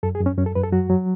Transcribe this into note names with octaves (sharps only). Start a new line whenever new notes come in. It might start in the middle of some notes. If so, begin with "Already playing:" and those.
F#2 A4
G#4
F#2
C#4
F#2 C#4
A4
F#2 B4
A4
F#3 F#4
F#3